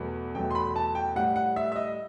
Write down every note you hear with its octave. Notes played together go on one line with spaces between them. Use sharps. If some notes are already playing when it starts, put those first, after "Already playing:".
Already playing: E2 B2 F#3 A3
E2 B2 F#3 A3 G5
C6
B5
A5
G5
A2 G3 F#5
F#5
E5
E5
D#5